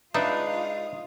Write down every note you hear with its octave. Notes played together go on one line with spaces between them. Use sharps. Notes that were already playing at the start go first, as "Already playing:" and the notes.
G#3 D4 D#4 F4 B4 E5 F5 D#6